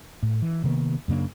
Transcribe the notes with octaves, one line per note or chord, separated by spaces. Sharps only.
A2
E3
C3 D#3 A#3 B3
F#2 C#3 A#3 D4